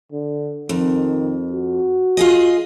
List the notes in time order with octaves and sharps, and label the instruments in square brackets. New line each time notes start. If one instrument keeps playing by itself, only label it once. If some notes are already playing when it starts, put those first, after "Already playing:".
[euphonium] D3
[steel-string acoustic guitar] F2 [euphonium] D#3
[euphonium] F#4
[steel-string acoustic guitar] F4 G#4 D#5